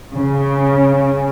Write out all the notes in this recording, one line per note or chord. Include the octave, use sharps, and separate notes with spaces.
C#3